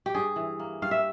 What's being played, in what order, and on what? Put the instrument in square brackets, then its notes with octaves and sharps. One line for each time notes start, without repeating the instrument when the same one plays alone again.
[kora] G4
G2 G#4
E3
A#3
G2 F5
E5